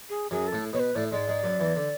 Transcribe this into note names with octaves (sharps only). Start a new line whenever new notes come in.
G#4
F#2 F#3 G#4
A4
A2 A3
B2 B3 C#5
B4
A2 A3 D5
G#2 G#3 D5
G#2 G#3
F#2 F#3
E2 E3
D3